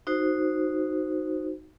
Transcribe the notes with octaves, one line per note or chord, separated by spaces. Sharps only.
D#4 F#4 C5